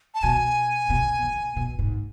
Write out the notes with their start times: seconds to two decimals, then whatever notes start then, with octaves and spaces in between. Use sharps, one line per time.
0.14 A5
0.23 B2 G#5
0.90 B2
1.23 B2
1.56 B2
1.79 G#2